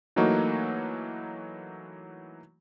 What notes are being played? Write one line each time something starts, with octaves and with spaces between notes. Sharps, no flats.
E3 F#3 A3 A#3 D#4 F#4